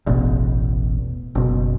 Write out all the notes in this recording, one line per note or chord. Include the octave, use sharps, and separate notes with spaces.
E1 A1 B2
F#1 B2